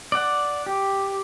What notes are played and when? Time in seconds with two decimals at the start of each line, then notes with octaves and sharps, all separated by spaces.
0.12 D5 F#5
0.66 G4